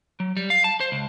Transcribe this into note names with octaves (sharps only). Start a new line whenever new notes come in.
F#3
G3
F5
A5
C5
C#2